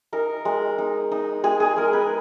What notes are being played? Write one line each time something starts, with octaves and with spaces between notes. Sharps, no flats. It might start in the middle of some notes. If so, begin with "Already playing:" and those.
D#4 A#4
G#3
D#4
D#4
G#3 G#4
G#4
G#3 A#4
B4